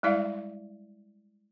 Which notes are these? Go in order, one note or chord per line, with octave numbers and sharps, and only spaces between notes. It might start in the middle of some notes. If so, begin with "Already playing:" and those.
G3 G#3 E4 D5 E5 F5